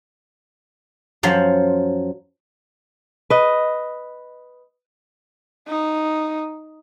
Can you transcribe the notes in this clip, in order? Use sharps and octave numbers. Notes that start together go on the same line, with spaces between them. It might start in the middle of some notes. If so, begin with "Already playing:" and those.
F#2 F3 F#3 C5
B4 D#5
D#4